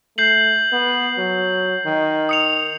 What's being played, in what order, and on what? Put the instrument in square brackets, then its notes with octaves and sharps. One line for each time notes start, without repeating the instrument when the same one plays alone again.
[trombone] A3 [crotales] G6 C7 F#7
[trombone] B3
F#3
D#3
[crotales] D#6 C#7 F7